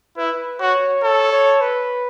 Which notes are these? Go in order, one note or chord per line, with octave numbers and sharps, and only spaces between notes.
E4 B4
F#4 C#5
A4 C#5
C#5
B4